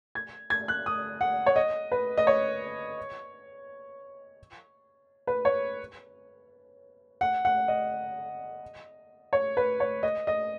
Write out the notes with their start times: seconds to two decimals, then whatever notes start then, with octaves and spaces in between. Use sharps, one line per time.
0.15 G#6
0.50 G#6
0.68 F#6
0.86 D#6
1.21 F#5
1.46 C#5
1.56 D#5
1.92 B4
2.18 D#5
2.27 C#5
5.27 B4
5.45 C#5
7.21 F#5
7.45 F#5
7.68 D#5
9.33 C#5
9.57 B4
9.80 C#5
10.03 D#5
10.27 D#5